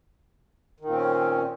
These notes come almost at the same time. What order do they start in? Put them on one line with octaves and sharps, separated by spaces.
D#3 A#2 C4 C#4